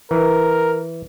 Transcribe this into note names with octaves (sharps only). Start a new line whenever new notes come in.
E3 A#4